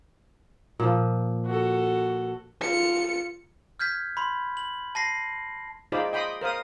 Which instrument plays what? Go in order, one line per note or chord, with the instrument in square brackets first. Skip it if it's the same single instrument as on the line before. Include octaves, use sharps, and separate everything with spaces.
[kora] A#2 F3
[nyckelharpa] F#4 A4
[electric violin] F4 C#7
[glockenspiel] F6 G6 G#6 B6
B5 C6
F#7
A5 A#6 C7
[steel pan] D#4 F4 G#4 C5 D5 B5
D#5 G5 B5 C6 D#6
A#4 C5 F5 D#6